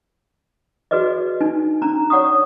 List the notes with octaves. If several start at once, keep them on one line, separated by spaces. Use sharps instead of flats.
F#4 G#4 B4 D5 D#5
D4 D#4 G#5
C#4 D4 A#5
C#5 D5 F#5 C#6 D#6